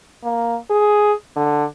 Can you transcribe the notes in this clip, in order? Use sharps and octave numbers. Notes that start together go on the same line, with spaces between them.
A#3
G#4
D3